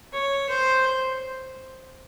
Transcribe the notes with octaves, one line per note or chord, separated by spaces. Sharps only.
C#5
C5